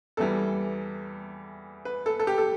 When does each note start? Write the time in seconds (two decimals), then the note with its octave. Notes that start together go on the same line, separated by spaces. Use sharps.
0.17 E2 E3 G3 A4
1.85 B4
2.06 A4
2.20 A4
2.27 G4
2.38 A4